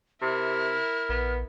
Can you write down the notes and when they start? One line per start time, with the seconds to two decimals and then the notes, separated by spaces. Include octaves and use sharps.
0.21 C3 E4 A#4 F6
1.09 A#1 B3